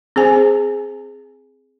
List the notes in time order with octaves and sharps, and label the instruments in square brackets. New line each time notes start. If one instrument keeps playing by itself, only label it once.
[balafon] C4 G#4 C5 G#5